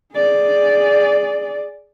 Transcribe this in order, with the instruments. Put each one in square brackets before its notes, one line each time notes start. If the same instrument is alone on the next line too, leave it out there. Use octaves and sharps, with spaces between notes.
[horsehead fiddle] G#4 D5